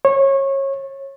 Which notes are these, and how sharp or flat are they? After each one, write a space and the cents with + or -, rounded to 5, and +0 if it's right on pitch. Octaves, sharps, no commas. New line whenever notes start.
C#5 -25